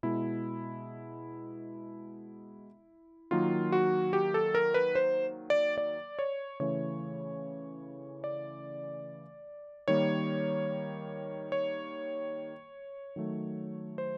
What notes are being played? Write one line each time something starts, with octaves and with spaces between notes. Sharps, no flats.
B2 G#3 E4
D#3 F#3 A#3 F4
F#4
G4
A4
A#4
B4
C5
D5
D5
C#5
C#3 E3 A3 C#5
D5
D#3 G3 A#3 C#5
C#5
D#3 F#3 A3
C5